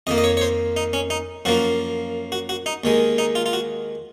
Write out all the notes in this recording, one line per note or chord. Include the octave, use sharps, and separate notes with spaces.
F2 D#3 A#3 D#5
D#5
C#5
C#5
C5
D#4
C#4
D#4
F#2 F3 A#3 F#4
F#4
F#4
D#4
D#2 D#3 G#3
D#4
F4
F4
F#4